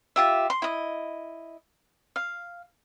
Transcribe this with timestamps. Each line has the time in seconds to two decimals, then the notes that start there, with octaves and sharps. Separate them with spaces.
0.16 F4 G4 E5
0.50 C6
0.62 E4 D#5
2.16 F5